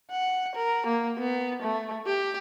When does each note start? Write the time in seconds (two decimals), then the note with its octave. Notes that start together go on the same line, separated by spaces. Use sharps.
0.11 F#5
0.55 A#4
0.87 A#3
1.19 B3
1.62 A3
2.06 G4